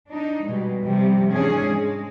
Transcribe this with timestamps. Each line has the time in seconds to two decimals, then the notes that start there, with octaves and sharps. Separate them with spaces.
0.11 D4 D#4
0.46 B2 G3 G#3
0.84 C3 F3 G3
1.32 G#2 E3 C#4 D4 G#4
1.68 G#3